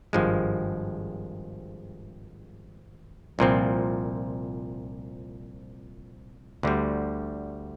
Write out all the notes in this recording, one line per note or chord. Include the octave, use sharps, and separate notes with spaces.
G#1 G2 F3 G#3
C2 A#2 F3 C4
D2 D3 G3